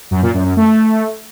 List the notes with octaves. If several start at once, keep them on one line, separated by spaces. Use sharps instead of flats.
F#2
A#2
F#2
F#2
A3